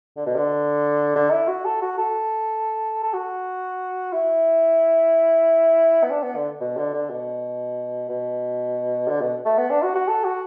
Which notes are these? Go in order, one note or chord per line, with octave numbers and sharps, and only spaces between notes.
D3
B2
D3
D3
E4
F#4
A4
F#4
A4
A4
F#4
E4
B3
D4
B3
D3
B2
D3
D3
B2
B2
D3
B2
A3
B3
D4
F#4
F#4
A4
F#4